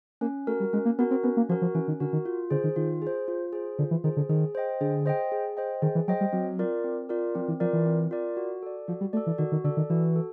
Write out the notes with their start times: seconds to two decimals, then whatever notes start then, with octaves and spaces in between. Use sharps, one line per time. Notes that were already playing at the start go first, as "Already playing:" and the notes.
0.21 A#3 C#4
0.47 A3 F#4 A#4
0.60 G3
0.73 G#3 C#4
0.85 A#3
0.99 B3 F#4 A#4
1.11 C4
1.24 B3 C#4
1.37 A#3
1.49 F3 F#4 A#4
1.62 F3
1.75 E3 C#4
1.88 D#3
2.00 D3 F#4 A#4
2.13 D#3
2.26 F4
2.50 D3 G#4 C5
2.64 D#3
2.76 D#3 F4
3.02 G#4 C5
3.28 F4
3.53 G#4 C5
3.79 D3 F4
3.91 E3
4.04 D#3 G#4 C5
4.17 D3
4.29 D#3 G#4
4.55 C5 D#5 G5
4.81 D3 G#4
5.06 C5 D#5 G5
5.32 G#4
5.57 C5 D#5 G5
5.82 D#3 G#4
5.95 E3
6.08 F#3 C5 D#5 G5
6.21 G3
6.33 F#3 C4
6.59 F4 A#4 D5
6.84 C4
7.09 F4 A#4 D5
7.35 F3 C4
7.48 E3
7.60 F3 F4 A#4 D5
7.73 E3
7.86 C4
8.11 F4 A#4 D5
8.37 F#4
8.63 A4 D5
8.88 F3 F#4
9.01 G3
9.13 A3 D5
9.17 A4
9.27 E3
9.38 D#3 F#4
9.52 D#3
9.64 D3 A4 D5
9.77 D#3
9.90 E3 F#4
10.16 A4